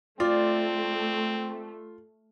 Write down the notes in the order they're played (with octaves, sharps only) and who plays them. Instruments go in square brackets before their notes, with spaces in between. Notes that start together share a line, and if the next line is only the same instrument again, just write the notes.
[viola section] A3 [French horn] C4 [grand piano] F4 [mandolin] D5